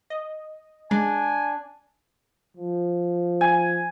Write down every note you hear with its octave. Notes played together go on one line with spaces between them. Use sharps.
D#5
G#3 D4 G#5
F3
G#5